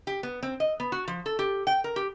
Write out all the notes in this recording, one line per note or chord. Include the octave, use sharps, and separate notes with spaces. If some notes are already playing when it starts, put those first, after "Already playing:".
G4
B3
C4
D#5
B3
F#4
F3
A4
G4
G5
A#4
G4